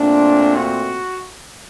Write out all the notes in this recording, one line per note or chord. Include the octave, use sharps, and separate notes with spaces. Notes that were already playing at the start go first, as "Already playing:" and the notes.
Already playing: A#2 A3 C4 D4
F#4